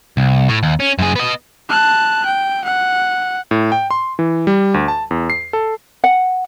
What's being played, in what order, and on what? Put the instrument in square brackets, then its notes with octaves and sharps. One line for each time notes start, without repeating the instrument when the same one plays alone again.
[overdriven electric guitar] C2
A2
D#2
C#4
F#2 G#4
B3 D#5
[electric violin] A5 F#6
G5
F#5
[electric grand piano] A2
G5
C6
E3
G3
D2
A5
E2
C7
A4
[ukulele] F#5